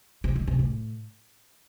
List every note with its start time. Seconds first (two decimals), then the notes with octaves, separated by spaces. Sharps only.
0.24 C3
0.36 D3
0.47 C3
0.59 A2